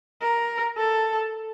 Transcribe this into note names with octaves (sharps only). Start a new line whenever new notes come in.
A#4
A4